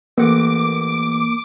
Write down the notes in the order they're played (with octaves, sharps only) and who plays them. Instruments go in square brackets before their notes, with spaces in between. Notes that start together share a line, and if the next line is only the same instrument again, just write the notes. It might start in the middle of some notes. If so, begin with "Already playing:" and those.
[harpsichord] A1 F#5 [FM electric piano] A#3 [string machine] D6